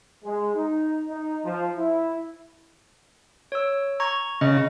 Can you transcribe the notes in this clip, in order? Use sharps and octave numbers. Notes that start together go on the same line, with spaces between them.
G#3
D#4
D#4
F3
E4
C#5 E6
A#5 C#6 G#6
C#3 D#5